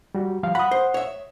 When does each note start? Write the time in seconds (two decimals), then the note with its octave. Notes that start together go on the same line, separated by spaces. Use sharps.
0.15 G3 F#4
0.43 F3 G3 F5
0.55 F#5 B5 D#6
0.71 C5
0.94 C#5 E5